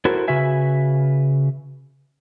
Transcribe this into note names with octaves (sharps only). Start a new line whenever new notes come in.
E4 F#4 A4 A#4 C5
C#3 F#4 B4 E5 G#5